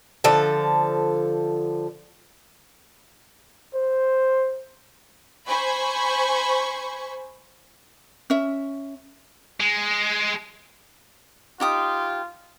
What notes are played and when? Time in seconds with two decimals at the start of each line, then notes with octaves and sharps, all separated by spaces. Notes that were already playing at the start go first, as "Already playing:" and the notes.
0.24 D3 F3 A4
3.75 C5
5.47 C5 G#5 B5 C#6
8.30 C#4 E5
9.60 G#3
11.60 D#4 F4 G4 D#6